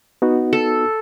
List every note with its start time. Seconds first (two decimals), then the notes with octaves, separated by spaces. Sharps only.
0.22 B3 D#4 F#4
0.53 A4